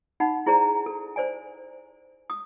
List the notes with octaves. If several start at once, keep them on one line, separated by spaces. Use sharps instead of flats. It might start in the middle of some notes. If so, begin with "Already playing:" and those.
D#4 F#5 B5
E4 G#4 C5 D5 A#5
A4
C5 D5 G#5
D#6